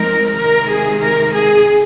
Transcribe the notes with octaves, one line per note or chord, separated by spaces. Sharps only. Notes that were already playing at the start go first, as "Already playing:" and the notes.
Already playing: F3 G#3 C4 D#4 A#4
C3 D#3 G#3 A#4
G#4
A#4
G#4